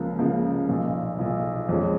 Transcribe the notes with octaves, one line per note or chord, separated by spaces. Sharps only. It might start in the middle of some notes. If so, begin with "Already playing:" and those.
Already playing: C#2 C#3 F3 A#3
C#2 C#3 F3 A#3
B1 A#2 F3
B1 A#2 F3
F2 F3 G#3 C#4